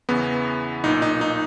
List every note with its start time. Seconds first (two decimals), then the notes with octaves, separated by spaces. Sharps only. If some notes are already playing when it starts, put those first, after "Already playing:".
0.09 E2 C#3 E3 B3
0.84 B1 A#2 D#4
1.02 D#4
1.21 D#4